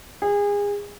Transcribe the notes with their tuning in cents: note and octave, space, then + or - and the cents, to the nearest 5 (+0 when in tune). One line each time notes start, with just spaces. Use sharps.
G#4 -30